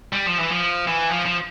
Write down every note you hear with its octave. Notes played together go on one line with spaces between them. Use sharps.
G3
F3
E3
F3
E3
F3
F3